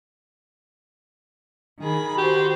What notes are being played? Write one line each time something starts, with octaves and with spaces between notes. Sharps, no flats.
D#3 G#4 B5
F#4 G4 C5